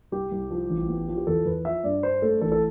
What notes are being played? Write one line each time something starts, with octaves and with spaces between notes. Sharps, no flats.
C2 G4
C2
F3
A1
B3
F3
G4
E2 A4
E2 B4
F3 E5
G2 D5
D4 C5
A3 A4
A1 A4
A4